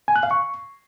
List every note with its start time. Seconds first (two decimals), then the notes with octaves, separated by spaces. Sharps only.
0.08 G#5
0.16 F#6
0.23 F5
0.31 C#6